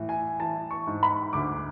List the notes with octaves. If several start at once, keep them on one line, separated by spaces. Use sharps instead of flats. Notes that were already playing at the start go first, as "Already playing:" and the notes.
Already playing: A2 E3
G#5
E3 A5
C#6
G#2
B5
D2 D6